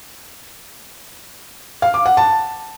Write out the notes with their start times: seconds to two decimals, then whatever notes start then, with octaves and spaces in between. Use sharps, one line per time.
1.82 F5
1.94 D6
2.06 F#5
2.17 A5